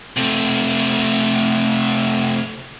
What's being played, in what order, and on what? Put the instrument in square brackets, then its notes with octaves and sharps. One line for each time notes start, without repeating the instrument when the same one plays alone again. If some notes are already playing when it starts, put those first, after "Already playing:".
[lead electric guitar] C3 A3